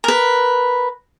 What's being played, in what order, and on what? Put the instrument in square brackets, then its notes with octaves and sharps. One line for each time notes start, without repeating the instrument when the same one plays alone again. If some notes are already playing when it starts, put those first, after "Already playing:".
[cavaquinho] A#4 B4